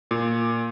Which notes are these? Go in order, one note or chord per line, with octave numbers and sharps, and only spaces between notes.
A#2